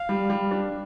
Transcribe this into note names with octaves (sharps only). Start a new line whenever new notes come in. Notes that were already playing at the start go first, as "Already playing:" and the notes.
Already playing: F5
G3
G3
D4